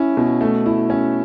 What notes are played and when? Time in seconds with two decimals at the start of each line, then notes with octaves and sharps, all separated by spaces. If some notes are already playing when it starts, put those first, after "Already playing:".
Already playing: C#4 E4
0.17 B2
0.41 A3
0.66 E4
0.90 C#4